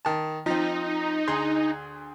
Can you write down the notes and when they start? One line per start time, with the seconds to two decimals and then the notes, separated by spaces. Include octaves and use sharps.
0.05 D#3 A5
0.46 F3 C4 D#4
1.28 D2 G#4 C6